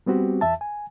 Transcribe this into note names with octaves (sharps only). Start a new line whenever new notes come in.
G3 B3 C4 F#4 G4
E2 E5 A5
G#5